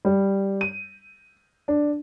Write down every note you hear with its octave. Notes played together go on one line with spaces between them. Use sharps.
G3
D#7
D4